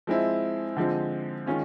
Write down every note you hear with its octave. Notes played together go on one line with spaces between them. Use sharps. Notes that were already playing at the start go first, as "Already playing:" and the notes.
F3 G#3 C4 E4
D3 F3 G#3 C4
D#3 G#3 C#4 F4